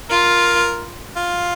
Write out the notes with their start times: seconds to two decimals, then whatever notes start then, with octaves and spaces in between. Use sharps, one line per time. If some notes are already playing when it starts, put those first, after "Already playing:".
0.10 F4 A#4
1.17 F4